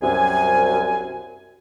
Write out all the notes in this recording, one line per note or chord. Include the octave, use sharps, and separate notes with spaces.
C2 F#2 C3 G#5